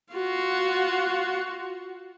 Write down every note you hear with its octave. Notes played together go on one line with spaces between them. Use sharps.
F4 F#4